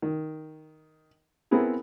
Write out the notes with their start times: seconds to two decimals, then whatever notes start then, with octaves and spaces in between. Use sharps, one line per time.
0.02 D#3
1.51 B3 C4 E4 G#4 A#4